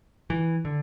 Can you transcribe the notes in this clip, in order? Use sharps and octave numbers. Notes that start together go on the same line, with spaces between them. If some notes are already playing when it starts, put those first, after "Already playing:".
E3
D3